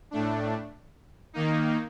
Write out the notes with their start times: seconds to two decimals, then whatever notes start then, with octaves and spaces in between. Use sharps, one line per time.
0.11 A2 A3 D4
1.33 D#3 A#3 D#4